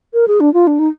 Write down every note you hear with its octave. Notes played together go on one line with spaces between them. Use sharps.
A#4
G#4
D4
F4
D4
D#4